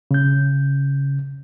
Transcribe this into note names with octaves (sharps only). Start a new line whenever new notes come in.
C#3 G6